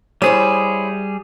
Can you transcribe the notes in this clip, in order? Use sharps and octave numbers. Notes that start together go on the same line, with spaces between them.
G3 E4 G#4 C5 C#5